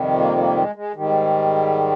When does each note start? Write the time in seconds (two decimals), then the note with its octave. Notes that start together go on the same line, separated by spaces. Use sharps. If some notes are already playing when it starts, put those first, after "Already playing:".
Already playing: F2 C3 D#3 G3
0.18 A#3
0.37 A#3
0.56 G#3
0.75 G#3
0.94 G#2 D#3 G3